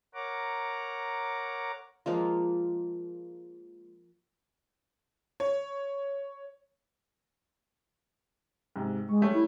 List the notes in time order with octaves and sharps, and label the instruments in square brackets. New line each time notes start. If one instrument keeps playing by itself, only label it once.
[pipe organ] A#4 C#5 F#5 A#5 D6
[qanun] F3 G#3 A#3 F4
[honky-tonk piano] C#5
[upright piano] G#2 C3
[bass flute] G#3 [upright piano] C#6
[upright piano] G3 A3 C#4
[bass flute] E4